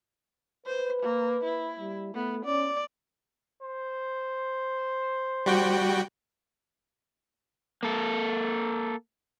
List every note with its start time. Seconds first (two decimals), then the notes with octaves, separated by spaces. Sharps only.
0.66 B4 C5
1.02 A#3
1.44 E4
1.79 G3
2.14 A3 B3
2.45 C#4 D5
3.62 C5
5.46 G3 F#4 G5
7.83 A#3 A4